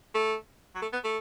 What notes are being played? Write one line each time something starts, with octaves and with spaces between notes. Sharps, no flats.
A3
F#3
A3
B3
A3